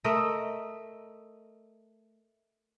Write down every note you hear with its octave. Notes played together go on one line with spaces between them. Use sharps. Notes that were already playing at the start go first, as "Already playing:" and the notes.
A3 A#4 D#5 E5